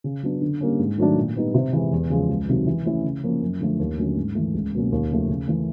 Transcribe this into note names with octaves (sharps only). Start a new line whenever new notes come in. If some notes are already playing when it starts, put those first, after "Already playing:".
C#3
F#3 B3 D4
D3
G3 A#3 C#4
G#2
D#3 F#3 A3 D4
A#2
G3 B3 D#4
C3
E3 G#3
E2
C#3 F3 G#3
C#2
C3 D#3 F#3
E3
A3 C#4 E4
C#3
F3 A#3 C#4
F#2
D3 F3 A3
D#2
D3 F#3 A3 C#4
G#2
E3 A3
C#2
B2 F#3 A#3 C#4
D#2
C#3 F3 A3
C#3
E3 A3